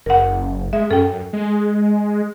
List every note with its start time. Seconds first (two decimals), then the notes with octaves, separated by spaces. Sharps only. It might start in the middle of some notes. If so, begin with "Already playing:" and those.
0.06 F#1 A#4 F#5
0.73 G#3 E5
0.91 F#2 A4 G5
1.33 G#3